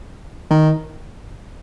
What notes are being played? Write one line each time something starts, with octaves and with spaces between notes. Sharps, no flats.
D#3